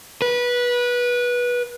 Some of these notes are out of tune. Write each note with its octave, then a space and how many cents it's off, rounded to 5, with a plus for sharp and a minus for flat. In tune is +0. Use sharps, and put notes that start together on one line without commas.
B4 -20